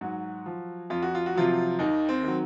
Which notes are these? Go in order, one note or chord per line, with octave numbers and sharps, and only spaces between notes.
G#2 F#3 F#4
F3
F2 F4
F#4
F4
F#4
C3 F3 F#3 F4
D#2 D#3 D#4
C4
D#3 F#3